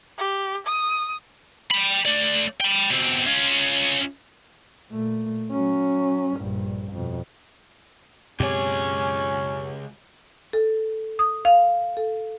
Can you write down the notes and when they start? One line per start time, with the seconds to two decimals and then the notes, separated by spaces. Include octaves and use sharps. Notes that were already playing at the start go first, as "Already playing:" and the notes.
0.18 G4
0.67 D#6
1.71 G5 B5
2.05 A3 D5
2.60 G5 B5
2.90 B2 C4
3.26 C#4 F4
4.90 A#2 A3
5.52 F#3 C#4
6.36 A#1 G2
6.93 F2 B2
8.40 C#2 F#2 B2 C4 C#4 G4 G#4 C#5
10.53 A4
11.19 D#6
11.45 F5
11.97 A4